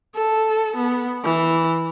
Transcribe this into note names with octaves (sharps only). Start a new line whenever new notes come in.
A4
B3
E3